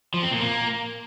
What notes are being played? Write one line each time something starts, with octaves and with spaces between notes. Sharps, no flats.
F3
C4
A#2
A#3